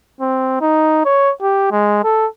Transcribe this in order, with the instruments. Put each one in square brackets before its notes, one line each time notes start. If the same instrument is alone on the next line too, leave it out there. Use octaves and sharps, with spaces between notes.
[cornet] C4
D#4
C#5
G4
G#3
A4